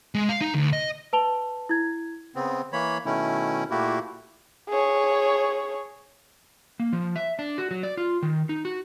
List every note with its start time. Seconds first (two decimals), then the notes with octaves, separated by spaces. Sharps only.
0.15 G#3
0.29 F5
0.41 D#4
0.54 D2
0.73 D#5
1.13 B4 A5 F7 G7
1.69 E4 G#6
2.35 C#3 B3 C4
2.73 E3 A#3 C#5 B5
3.06 B2 D#3 A3 C#4 E4
3.71 A#2 A3 A#3 E4 F#4 G4
4.69 G#4 C#5
6.80 A#3
6.93 F3
7.16 E5
7.39 D4
7.58 F#4
7.71 F#3
7.83 D5
7.97 F4
8.22 D#3
8.49 D#4
8.65 F#4